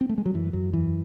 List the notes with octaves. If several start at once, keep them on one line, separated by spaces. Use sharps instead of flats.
C4
A3
G#3
F#3
F#2 E3
F#2 F#3
E2 E3